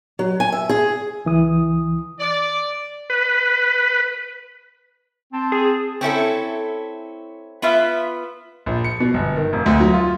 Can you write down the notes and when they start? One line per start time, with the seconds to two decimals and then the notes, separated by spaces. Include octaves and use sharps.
0.19 F#3
0.40 G#5
0.52 E5
0.69 G#4
1.25 C#2 E3 D#6
2.20 D5
3.10 B4
5.33 C4 A5
5.52 G#4
6.01 C4 C#4 E4 A4
7.62 B3 F4 B4 E5
8.66 A#1
8.84 C#7
9.00 B2
9.14 G1
9.37 D#3
9.53 F1
9.66 D2
9.80 F#3
9.94 F4